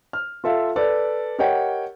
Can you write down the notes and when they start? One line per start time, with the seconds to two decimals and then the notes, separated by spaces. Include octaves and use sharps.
0.13 F6
0.44 F4 A4 E5 F5
0.76 A4 B4 D5
1.39 G4 A#4 C#5 D#5 F#5 G5